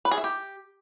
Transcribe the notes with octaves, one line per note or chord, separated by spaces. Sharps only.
B4
G#4
E5
G4